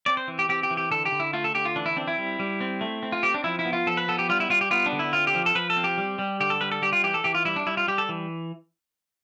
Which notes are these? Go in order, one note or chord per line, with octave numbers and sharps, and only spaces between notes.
C4 D5
C5
E3
G4
C4 G4
G4
E3
G4
D3 A4
G4
D3
E4
A3 F4
A4
D3 G4
F4
E3 D4
E4
C4 D4
E4
G3
G3
C4
A3
C4
F4
C4 G4
D4
F3 E4
E4
B3
F4
F3 A4
B4
B3 A4
G4
G3 F4
E4
G3 F4
G4
B3 F4
D4
D3
E4
C4 F4
G4
F3
A4
F3 B4
A4
C4
G4
G3
G3
D3 G4
A4
G3 B4
A4
G3 G4
F4
E3 G4
A4
E3 G4
F4
G3 E4
D4
G3 E4
F4
G3 G4
A4
E3